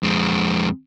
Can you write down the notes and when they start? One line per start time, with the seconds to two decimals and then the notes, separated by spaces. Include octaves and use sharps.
0.03 F2 G#3